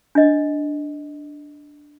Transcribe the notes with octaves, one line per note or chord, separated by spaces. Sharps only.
D4 D#5